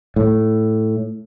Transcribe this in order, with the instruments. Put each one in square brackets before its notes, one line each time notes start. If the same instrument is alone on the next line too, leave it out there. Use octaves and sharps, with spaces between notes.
[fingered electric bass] A2